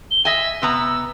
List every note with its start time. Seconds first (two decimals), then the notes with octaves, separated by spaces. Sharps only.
0.10 G7
0.25 D#5 E5 G#5
0.62 C3 B3 A#5 E6